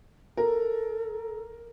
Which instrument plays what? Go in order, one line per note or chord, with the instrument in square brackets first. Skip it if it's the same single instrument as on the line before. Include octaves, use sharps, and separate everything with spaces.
[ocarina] A4 [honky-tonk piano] A#4